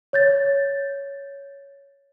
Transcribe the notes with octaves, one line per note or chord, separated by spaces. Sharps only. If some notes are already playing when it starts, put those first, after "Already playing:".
C#5 G6 A6